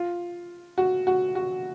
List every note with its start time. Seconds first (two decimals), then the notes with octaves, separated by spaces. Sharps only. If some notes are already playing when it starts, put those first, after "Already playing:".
Already playing: F4
0.78 F#4
1.07 F#4
1.35 F#4